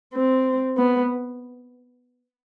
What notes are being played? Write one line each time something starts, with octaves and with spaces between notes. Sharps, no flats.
C4
B3